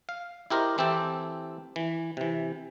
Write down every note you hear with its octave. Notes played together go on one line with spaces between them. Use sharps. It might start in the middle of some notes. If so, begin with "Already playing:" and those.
F5
E4 G4 A#4 C5 D#5
E3 C4 E4 G4 A4
E3
C3 E3